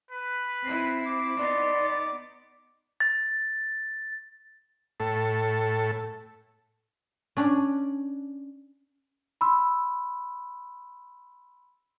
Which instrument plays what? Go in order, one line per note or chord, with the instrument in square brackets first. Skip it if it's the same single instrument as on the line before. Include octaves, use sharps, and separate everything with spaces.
[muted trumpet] B4
[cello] C4 E4
[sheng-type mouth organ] D6
[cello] B3 D#4 [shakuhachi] D5 [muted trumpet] C6
[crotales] A6
[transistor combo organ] A2 A4
[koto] C#4 D4
[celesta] B5 C6 E6